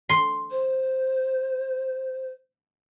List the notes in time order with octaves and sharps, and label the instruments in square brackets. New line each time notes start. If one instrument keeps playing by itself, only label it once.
[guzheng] C6
[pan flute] C5